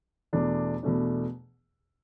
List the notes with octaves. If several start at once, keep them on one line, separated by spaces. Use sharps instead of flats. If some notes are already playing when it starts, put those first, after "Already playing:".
E2 B2 A3 D4
E2 B2 A3 D4